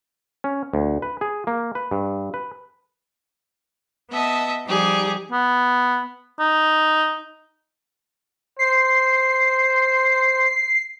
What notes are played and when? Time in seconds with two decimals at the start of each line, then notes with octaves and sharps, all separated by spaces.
0.44 C#4
0.74 D2
1.02 B4
1.21 G#4
1.47 A#3
1.75 B4
1.91 G2
2.34 B4
4.09 B3 D#5 E5 A5
4.65 F3 G3 D#4 G4 G#4 D5
5.32 B3
6.40 D#4
8.59 C5 C7